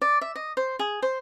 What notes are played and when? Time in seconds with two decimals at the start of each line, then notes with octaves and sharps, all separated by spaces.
0.02 D5
0.21 E5
0.35 D#5
0.57 C5
0.79 G#4
1.02 C5